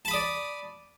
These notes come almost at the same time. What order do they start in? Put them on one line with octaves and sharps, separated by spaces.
A5 B5 D#6 D5